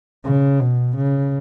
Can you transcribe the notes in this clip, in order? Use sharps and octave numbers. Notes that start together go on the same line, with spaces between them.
C#3
B2
C#3